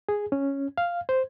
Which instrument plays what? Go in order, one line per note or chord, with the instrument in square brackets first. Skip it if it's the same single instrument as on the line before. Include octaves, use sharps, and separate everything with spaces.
[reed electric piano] G#4
C#4
F5
C5